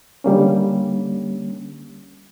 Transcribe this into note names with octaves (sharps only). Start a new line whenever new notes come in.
D3 G3 A#3 C#4